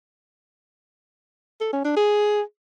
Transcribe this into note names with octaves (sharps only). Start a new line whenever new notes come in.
A4
C#4
D4
G#4